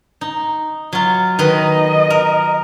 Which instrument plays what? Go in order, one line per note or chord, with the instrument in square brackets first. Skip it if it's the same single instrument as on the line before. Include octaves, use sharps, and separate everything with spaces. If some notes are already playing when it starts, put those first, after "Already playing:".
[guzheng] D#4
F#3 F4
[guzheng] D#3 D#4 B4 [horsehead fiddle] D#5
[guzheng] A#4